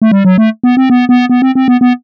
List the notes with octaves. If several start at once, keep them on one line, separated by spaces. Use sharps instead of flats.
A3
G3
F#3
A3
B3
C4
B3
B3
B3
C4
C4
B3
B3